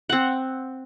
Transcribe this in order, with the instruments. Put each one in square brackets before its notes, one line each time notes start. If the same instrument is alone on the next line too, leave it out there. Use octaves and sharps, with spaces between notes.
[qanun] C4 F#5